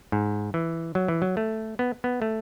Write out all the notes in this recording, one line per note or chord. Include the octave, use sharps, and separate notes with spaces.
G#2
E3
F#3
E3
F#3
A3
B3
B3
A3